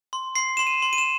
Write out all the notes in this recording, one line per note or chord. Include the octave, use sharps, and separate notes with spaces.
C6
C6 C7
C6 E7
D#7
C6
D#7
E7